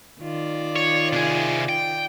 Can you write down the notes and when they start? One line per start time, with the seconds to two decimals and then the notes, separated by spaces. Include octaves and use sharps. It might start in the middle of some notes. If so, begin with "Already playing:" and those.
0.20 D#3 F4 D5
0.76 C#5
1.13 C3 G#4
1.69 G5